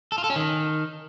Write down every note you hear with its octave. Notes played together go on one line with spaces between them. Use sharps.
A4
F4
A4
C#4
D#3